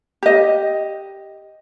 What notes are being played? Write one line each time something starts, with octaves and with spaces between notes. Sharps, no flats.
G4 D#5